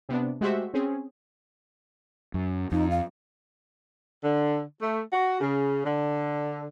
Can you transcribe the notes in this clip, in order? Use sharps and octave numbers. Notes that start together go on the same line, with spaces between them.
C3 B3 D4
G#3 A3 F#4 G4 C5 E5
C4 C#4 G#4
F#2
F2 D#4
F5
D3
A3
F#4
C#3
D3